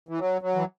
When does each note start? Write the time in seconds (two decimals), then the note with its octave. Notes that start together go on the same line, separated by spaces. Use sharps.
0.09 E3
0.19 F#3
0.42 F#3
0.55 E3